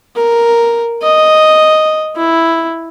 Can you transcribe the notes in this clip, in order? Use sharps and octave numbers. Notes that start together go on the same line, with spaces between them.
A#4
D#5
E4